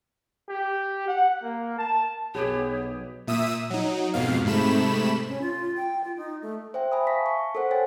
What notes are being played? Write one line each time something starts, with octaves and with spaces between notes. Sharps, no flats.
G4
F#5
A#3
A5
B1 B3 G4 G#4 C#5
A#2 E5 D#6 E6 D#7
F#3 D#4
F2 G#2 B2 F5
G#2 C3 A3 B5 E7
C#4
F4
G5
F4
D#4
A3
C5 E5 G5
E5 G#5 B5 D#6
F5 A5 C#6 A#6 B6
C#6
A4 A#4 C5 F#5
C5 C#5 G5 G#5 A6